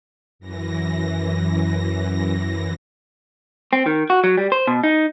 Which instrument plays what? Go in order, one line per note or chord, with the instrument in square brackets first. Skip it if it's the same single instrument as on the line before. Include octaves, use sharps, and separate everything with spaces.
[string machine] F#2 E3 A#6
[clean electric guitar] C4
D#3
F#4
F#3
G3
C5
B2
D#4